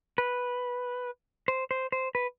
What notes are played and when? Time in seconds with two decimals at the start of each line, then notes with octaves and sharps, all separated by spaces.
0.18 B4
1.48 C5
1.71 C5
1.92 C5
2.15 B4